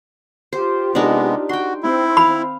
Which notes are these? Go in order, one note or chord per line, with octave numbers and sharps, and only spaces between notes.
F4 G4 C5
C3 G#3 B3 D4 D#4 A#4
F#4 G5 C6
C4 E4
F5 B5